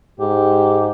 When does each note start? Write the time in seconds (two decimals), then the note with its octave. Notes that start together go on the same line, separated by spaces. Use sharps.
0.20 G#2 G4